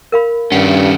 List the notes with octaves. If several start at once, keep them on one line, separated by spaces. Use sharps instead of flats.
A#4 F5 B5
G2 D#3 C#4 F#5